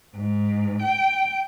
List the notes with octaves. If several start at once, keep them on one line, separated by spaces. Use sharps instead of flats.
G#2
G5